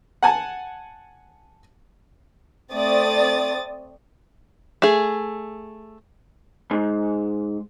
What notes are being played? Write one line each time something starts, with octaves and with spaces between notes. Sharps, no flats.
F#5 G#5 A5
A3 C4 D5 D#6 A6
A3 G#4
G#2